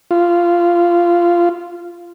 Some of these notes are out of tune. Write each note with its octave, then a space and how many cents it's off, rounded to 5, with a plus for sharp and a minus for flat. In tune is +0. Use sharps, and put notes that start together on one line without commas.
F4 -15